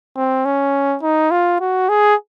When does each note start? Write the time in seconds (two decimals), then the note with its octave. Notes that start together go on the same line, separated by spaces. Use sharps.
0.16 C4
0.45 C#4
1.02 D#4
1.31 F4
1.60 F#4
1.89 G#4